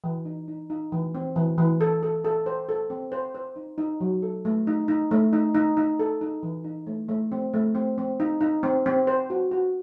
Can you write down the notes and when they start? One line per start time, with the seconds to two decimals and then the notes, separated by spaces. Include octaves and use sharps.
0.04 E3
0.25 D#4
0.48 D#4
0.70 D#4
0.92 E3
1.15 C4
1.36 E3
1.58 E3
1.81 A4
2.03 A4
2.25 A4
2.46 C5
2.69 A4
2.90 C4
3.12 C5
3.35 C5
3.56 D#4
3.78 D#4
4.01 F#3
4.23 A4
4.45 A3
4.67 D#4
4.88 D#4
5.11 A3
5.33 D#4
5.55 D#4
5.77 D#4
5.99 A4
6.21 D#4
6.43 E3
6.64 D#4
6.87 A3
7.09 A3
7.32 C4
7.54 A3
7.75 C4
7.98 C4
8.20 D#4
8.41 D#4
8.63 C4
8.86 C4
9.07 C5
9.30 F#4
9.52 F#4